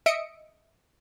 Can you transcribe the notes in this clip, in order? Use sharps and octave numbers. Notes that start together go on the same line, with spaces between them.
D#5 E5 D#6 C#7 D7